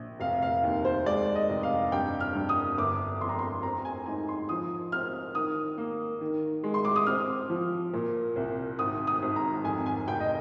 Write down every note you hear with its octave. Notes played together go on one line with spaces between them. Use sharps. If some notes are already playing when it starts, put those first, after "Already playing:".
Already playing: A#1
F1 F5
F5
D#2
C5
G#3 D5
D#5
F1
F5
G2 G5
F6
G2
D#6
G1 D6
F2 C6
A#5
C6
C4 A#5
G#5
G#2 G#5
C6
F3 D#6
C4 F6
D#3 D#6
A#3
D#3
G#3
C6
D6
D#6
C4 F6
F3
A#2
C2
G#1 D#6
D#6
G#1
A#5
F2 G#5
G#5
F1 G5
D#5